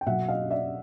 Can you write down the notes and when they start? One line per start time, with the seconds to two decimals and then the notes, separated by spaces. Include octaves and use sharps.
0.01 G5
0.06 B2 F#3 E5 F#5
0.28 D#5 F5
0.50 D5 E5